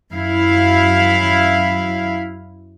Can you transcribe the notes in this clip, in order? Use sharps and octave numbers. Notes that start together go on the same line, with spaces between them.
F#2 E4 F5